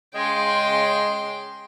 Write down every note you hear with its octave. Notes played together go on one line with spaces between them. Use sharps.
C#3 G#3 G5 C6